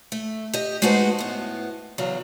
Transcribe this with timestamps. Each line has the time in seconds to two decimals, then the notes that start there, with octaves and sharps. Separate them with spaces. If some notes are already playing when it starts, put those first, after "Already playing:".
0.12 A3
0.53 G4 D#5
0.82 G#3 A3 D#4 F#4 B4 C5
1.19 A2 B3
1.98 E2 C#3 F#3